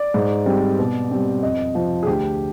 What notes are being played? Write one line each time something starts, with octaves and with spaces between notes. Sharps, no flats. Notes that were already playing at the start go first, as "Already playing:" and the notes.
Already playing: D5
G#2
G3 C4
B2
G3 C4
F2 D#5
C3 F3
G#4
D2 G4